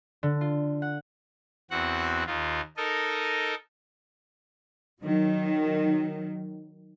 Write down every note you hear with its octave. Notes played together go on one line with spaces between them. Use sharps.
D3
F4
F#5
E2 C4 F#4 F#5
D#2 D#3 F4
D#4 A4 A#4 D#5
D#3 F#3